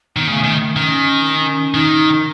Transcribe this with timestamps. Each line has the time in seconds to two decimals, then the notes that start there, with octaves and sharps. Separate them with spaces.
0.16 D#3 B3
0.28 C#3 A3
0.44 D#3
0.76 D#3 C#4
1.26 C#4
1.74 D#3 D#4